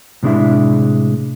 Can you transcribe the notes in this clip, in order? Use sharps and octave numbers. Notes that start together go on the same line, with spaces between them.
A2 C3 G#3 D4 E4 E5